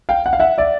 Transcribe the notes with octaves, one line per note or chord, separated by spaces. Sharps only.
F5 G5
F#5
F5
E5 F#5
D5 E5